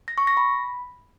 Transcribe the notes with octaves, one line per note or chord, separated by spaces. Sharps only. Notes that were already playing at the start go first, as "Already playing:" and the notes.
A#6
C#6
A#6
B5